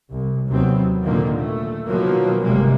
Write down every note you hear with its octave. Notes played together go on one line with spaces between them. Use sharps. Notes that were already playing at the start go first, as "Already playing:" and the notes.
C2
D#2 C3 F#3 B3 C4
A#2 D3 D#3 F3 A#3
A3
B2 D#3 F3 F#3 A#3
G1 C3 G3 G#3 A#3